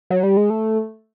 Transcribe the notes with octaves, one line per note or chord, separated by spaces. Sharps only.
F#3
G3
G#3
A3